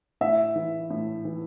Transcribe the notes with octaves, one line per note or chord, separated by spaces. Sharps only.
A2 E5
E3
A2
E3